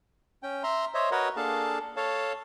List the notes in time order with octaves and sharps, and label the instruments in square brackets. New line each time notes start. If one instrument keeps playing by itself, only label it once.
[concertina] C#4 G5
E5 A#5 C6
C5 C#5 D#5 E5
F#4 A#4 B4 C#5 D#5 F#5
A#3 D4 G#4 A4 F5 A5
A4 C#5 F5 A5